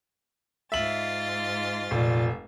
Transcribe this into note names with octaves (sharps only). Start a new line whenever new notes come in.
G#2 F4 E5 A6 F#7
F1 A#2